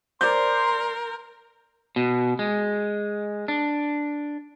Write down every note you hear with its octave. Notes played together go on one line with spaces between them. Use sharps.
A#4 C5 D5 C6 G6
B2
G#3
D4